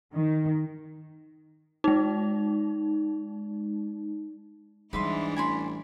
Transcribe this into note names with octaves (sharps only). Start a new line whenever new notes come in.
D#3
G#3 D#4
G#2 E3 G3 D4 B4 E5 C6
A1 G#5 B5 C6